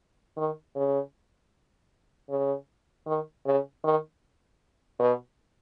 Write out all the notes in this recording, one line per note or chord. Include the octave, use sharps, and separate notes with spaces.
D#3
C#3
C#3
D#3
C#3
D#3
B2